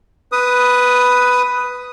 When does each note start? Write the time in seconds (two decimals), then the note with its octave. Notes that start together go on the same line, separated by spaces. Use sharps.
0.32 B4 D#6